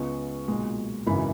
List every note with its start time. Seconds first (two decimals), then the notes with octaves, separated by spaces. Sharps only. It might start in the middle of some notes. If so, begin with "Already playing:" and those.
Already playing: C#2 C#3 G#3 B3 C#6
0.48 B1 A#2 G#3
1.07 G#1 F#2 C#3 E3 B5